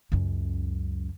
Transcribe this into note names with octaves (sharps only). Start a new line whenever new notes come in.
C#2 F#2